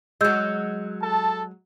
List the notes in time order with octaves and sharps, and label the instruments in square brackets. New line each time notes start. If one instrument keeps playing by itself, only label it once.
[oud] F#3 G#3 [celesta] D#5 E6 G6
[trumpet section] A4 A5